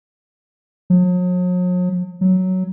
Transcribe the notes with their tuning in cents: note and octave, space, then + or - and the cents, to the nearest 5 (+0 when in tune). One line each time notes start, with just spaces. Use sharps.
F#3 -45
F#3 +5